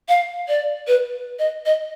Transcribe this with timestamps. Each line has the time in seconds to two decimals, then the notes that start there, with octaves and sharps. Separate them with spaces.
0.09 F5
0.48 D5
0.87 B4
1.39 D#5
1.66 D#5